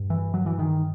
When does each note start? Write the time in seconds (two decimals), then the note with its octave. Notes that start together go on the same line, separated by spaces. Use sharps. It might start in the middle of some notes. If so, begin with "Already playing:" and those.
Already playing: G2
0.10 E3
0.34 F#3
0.46 E3
0.59 D#3